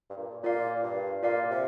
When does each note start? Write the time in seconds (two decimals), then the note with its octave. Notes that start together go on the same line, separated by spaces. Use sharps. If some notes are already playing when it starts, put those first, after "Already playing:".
0.10 G2
0.17 A#2
0.43 A#2 F4 D5 F5
0.83 G2
1.23 A#2 F4 D5 F5
1.50 C3